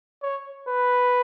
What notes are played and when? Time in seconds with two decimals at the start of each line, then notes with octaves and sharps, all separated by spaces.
0.23 C#5
0.68 B4